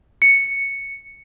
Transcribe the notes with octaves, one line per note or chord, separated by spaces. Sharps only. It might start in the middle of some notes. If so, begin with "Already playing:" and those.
C#7